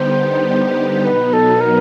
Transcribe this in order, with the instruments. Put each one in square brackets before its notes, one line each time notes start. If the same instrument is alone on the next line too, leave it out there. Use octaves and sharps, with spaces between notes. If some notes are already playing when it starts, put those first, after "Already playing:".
Already playing: [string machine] D3 G3 B3 D#4 G4 [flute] C5
[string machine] B2 F#3 B3 D#4 [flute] B4
[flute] A4
A#4